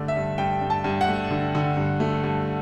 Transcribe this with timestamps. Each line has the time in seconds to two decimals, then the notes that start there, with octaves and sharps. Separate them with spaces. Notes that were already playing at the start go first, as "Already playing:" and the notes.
Already playing: G2 D3 A3 D5
0.08 E5
0.16 G2
0.38 G2 G5
0.61 G2
0.70 A5
0.84 G2
1.01 F#5
1.08 A3
1.31 D3
1.55 D3
1.77 G2
2.00 A3
2.24 G2